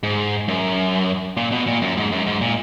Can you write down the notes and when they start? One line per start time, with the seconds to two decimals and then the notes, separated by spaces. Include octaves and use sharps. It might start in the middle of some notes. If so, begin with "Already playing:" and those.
0.03 G#2
0.48 F#2
1.37 A#2
1.52 B2
1.67 A#2
1.82 F#2
1.97 G#2
2.12 F#2
2.27 G#2
2.41 A#2